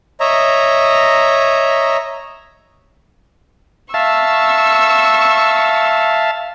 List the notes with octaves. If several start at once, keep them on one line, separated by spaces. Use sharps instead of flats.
C#5 D#5 E5 A#5
E5 F5 A5 C#6 E6